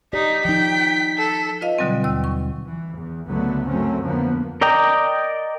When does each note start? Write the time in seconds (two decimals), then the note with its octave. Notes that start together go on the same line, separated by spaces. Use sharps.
0.13 D#4 G4 D5 B6
0.45 F3 D#4 G5
1.17 A4
1.61 F4 B4 D#5 F5
1.78 B2 D3 F#3 G3 C4
2.04 D#2 E6
2.24 C#6
2.67 E3
2.97 E2
3.26 C#2 F#2 D3 F#3 A3 B3
3.67 F#2 F#3 A3 C4 C#4
4.02 F2 D3 F3 A#3 B3
4.61 A#4 D5 D#5 G5 A#5